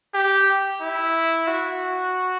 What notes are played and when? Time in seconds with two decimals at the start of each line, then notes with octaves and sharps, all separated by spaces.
0.14 G4
0.82 E4
1.47 F#4